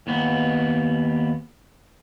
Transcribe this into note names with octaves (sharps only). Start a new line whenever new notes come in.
D#2 B3